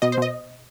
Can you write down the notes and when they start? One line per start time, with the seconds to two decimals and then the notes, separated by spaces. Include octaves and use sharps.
0.02 B2 D#5
0.12 C5
0.18 B2 D#5